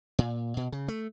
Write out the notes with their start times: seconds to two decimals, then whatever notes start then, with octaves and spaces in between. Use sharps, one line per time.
0.19 A#2
0.57 B2
0.72 C#3
0.88 A3